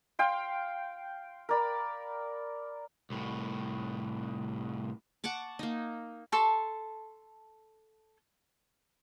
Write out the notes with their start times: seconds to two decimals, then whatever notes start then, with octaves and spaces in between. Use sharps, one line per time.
0.19 F5 G5 C6
1.49 A#4 D5 B5
3.10 C2 A2
5.24 F#5 A5 C#6 D6
5.59 A#3 D#4
6.32 A4 A5 C6 C#6